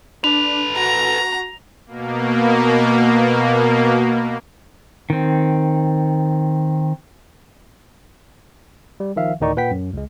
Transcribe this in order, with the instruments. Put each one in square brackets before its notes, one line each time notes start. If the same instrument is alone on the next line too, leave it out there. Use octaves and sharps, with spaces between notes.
[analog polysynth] D4 [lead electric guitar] A4 B4 [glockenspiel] F7
[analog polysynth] F#4 [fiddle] A#5
[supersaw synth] B2 A#3
[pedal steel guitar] D#3 C4
[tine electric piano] G3
D#3 F3 E5 F5
D2 A2 D#3 D#4 D5 C#6
A#2 B4 F#5 G5 B6
F#2
C#2 G#3